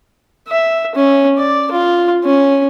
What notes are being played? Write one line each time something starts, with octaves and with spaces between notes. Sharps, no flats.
E5
C#4
D5
F4
C#4